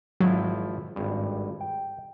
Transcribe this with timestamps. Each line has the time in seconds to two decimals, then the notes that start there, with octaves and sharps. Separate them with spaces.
0.20 G#1 F3 F#3 E4
0.96 G#1 G2
1.61 G5